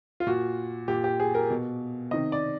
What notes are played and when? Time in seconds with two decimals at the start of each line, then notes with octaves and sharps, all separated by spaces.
0.20 F4
0.27 A#2 F#4
0.88 A#2 G4
1.04 G4
1.20 G#4
1.35 A#4
1.50 B2
2.11 C3 D#3 D#5
2.32 D5